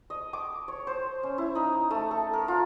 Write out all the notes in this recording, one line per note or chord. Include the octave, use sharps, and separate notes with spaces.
D#5
D6
C#5
C5
C#4
E4
D#4
A3
A4
A#4
F4